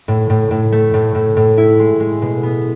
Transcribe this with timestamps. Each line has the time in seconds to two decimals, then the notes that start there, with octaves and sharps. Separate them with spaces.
0.08 A2
0.30 A2
0.51 A2
0.72 A3
0.94 A2
1.15 A2
1.37 A2
1.58 E4
1.79 G#3
2.00 G#3
2.22 B2
2.43 B3